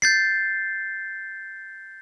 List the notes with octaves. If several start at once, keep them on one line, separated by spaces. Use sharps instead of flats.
G6 A6 C7